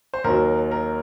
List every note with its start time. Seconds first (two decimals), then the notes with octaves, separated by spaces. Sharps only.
0.14 C5
0.24 D#2 D#3 F#3 A#4
0.71 A#4